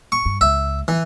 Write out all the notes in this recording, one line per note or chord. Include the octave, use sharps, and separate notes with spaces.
C#6
G2
C#2 E5
E3